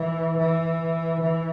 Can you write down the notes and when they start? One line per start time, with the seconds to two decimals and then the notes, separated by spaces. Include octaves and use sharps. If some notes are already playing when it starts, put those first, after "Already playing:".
Already playing: E3
0.38 E3
1.21 E3